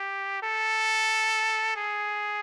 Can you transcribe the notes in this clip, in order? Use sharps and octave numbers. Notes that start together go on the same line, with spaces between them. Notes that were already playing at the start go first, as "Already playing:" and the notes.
Already playing: G4
A4
G#4